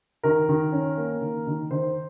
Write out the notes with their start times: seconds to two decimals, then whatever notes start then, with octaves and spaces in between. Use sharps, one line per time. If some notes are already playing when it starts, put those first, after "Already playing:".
0.23 D#3 A#4
0.49 D#3
0.72 C#4
0.97 A#3
1.21 D#3
1.47 D#3
1.71 D#3 C5